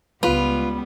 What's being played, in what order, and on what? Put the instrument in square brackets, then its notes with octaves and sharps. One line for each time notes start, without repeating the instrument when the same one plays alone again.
[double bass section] C#2 [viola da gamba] G3 B3 [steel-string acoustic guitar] F4 [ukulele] B4